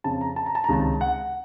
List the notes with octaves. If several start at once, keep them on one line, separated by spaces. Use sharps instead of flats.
F2 C#3 A5
A#5
A5
A#5
A5
A#5
C#2 C3 D#3 A5
F#5